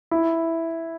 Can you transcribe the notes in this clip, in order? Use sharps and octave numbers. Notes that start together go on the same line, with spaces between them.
E4